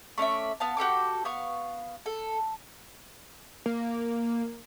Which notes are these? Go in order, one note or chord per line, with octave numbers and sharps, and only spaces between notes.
A3 C#4 D5 E5
B3 F5 A5
F#4 G4 A4 D6
B3 F5 C#6
A4
A#3